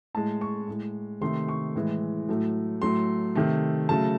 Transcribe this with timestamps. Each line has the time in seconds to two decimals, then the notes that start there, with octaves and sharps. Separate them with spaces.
0.14 A2 G#3 A5
0.41 C#6
0.68 A2 G#3
1.21 C3 D#3 A3 C6
1.48 C#6
1.75 A2 E3 G#3
2.29 A2 F#3 A3
2.82 A2 F#3 A3 C6
3.35 C3 D#3 A3
3.89 C#3 F#3 A3 A5